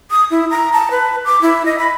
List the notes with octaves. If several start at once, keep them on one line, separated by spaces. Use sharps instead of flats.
D#6
E4
A#5
A5
B4
D6
E4
D#5
B5